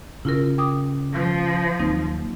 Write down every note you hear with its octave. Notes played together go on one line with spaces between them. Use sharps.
C#3 E4 F4 A#4
G5 D6 D#6
F3
D#2 F#3 C4 D#4